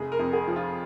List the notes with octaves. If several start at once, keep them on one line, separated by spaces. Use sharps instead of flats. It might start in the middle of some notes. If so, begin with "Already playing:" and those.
Already playing: F1 G#4
A#4
F2
G#4
F3
F4